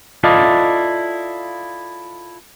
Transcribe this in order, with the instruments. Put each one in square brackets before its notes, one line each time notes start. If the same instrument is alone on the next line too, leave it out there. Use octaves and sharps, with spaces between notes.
[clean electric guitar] E4 F4 A4 D5 D#5 F5